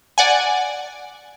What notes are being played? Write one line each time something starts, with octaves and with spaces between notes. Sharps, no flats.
D5 F#5 G#5